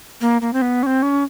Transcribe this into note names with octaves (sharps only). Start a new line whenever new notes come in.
A#3
A#3
C4
B3
C#4
C4
C#4